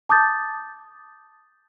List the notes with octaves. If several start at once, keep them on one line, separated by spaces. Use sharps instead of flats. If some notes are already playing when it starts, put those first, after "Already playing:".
A5 D6 D#6 G6 A6